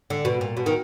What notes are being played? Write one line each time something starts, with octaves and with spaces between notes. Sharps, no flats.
D3
B2
A#2
B2
D#3